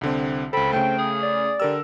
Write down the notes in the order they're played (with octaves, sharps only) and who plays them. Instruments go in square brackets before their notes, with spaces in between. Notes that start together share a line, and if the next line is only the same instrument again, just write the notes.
[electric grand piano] C2 D3 C4
[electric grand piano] C#2 A4 [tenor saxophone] C4 [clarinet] B5
[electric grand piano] C#3 A3 [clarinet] G5
[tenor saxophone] G#4
[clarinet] D5
[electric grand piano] D3 A#4 E6 [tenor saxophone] G3